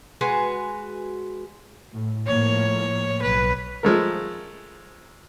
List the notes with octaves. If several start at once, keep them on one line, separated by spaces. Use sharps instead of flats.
G#3 F#4 B4 G#5
A2
A2 F3 A#3 C#5
B1 B4
F3 G#3 A3 A#4